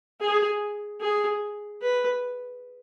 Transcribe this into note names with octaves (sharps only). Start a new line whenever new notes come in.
G#4
G#4
B4